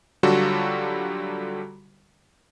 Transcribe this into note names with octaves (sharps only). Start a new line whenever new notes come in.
D3 F#3 G3 F4 F#4 A4